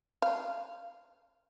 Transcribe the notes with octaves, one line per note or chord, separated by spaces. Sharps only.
F5